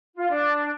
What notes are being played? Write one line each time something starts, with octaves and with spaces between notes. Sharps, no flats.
F4
D4